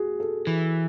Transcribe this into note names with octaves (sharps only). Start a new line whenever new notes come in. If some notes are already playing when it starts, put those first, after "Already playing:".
Already playing: F#4 G#4
A4
E3